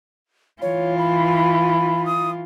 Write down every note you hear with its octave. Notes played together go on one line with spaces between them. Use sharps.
E3 F4 C#5
B5
D#6